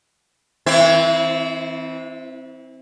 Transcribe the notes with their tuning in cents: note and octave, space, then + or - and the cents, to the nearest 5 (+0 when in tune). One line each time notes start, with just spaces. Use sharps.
E3 -30 C4 +0 E4 +20